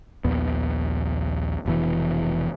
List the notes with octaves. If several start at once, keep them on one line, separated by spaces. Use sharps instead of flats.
A#1 D#2 B3
F1 B2 E3